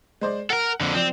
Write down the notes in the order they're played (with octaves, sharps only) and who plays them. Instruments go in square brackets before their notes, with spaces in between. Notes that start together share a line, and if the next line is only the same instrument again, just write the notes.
[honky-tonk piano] G#3 C5 D5
[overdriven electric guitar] A4 A#4 [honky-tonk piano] F#5
[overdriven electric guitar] F2 D3
[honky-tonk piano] F3 D5 E7 [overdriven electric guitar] C4